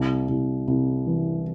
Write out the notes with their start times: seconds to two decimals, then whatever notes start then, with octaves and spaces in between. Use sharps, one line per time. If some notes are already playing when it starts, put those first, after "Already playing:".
Already playing: C2
0.29 C2
0.68 C2
1.07 E3